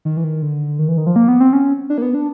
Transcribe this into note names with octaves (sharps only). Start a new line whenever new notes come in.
D#3
E3
D#3
D3
D#3
E3
D#3
F3
A#3
B3
C4
C#4
D4
A#3
B3
D4